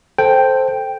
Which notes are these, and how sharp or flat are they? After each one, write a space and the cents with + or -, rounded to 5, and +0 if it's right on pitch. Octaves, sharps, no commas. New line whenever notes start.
A4 +0 C5 +0 G5 +0